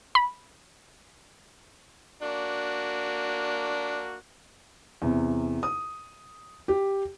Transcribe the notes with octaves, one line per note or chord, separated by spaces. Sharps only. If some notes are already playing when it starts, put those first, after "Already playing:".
B5
A#3 D4 F#4
E2 C3
D#6
G4